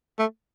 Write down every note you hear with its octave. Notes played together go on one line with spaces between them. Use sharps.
A3